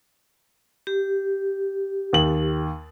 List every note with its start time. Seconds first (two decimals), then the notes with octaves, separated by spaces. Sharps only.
0.87 G4
2.13 D#2 F#7